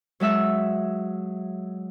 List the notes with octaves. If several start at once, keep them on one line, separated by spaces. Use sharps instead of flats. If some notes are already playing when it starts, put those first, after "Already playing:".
F#3 G#3 E5 E6